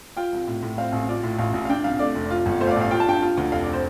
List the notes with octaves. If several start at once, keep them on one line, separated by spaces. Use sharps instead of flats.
F4 G5
C2
A2
A2
C4 F5
A1
F4 D5
A2
A1 F5
A1
F5
D4 G5
C2 F5
A3 D5
F1
F4
G1
A3 C5
F5
D5
A1
F5
F4 G5
A5
G2 G5
F4
D2
F1 F5
D5
C5